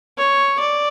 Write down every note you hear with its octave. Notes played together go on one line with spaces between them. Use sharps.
C#5
D5